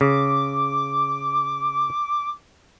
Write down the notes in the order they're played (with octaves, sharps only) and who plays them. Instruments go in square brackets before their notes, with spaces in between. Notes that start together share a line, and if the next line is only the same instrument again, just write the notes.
[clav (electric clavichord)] C#3 [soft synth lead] D6